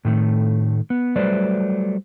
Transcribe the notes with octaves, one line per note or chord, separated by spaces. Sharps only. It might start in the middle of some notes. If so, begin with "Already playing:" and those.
A2 D#3 A3
B3
F#3 G3 A3 B4 C5 D5